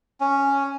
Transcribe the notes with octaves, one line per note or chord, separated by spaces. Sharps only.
C#4